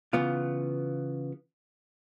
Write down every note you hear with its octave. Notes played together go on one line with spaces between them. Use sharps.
C#3 E3 B3 F4